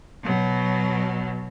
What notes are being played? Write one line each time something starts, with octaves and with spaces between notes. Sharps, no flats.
B2 F#3